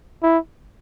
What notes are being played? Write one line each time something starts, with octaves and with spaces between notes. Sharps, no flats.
E4